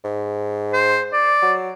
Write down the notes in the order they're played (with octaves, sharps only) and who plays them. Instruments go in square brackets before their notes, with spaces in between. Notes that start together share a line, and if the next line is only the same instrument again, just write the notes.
[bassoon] G#2
[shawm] C5
D5
[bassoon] F#3